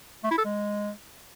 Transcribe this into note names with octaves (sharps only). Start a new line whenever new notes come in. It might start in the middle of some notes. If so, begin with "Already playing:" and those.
A3
E4
A4
G#3